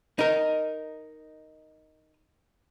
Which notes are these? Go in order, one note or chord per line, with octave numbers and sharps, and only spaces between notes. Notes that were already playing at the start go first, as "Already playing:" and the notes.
D#4 A#4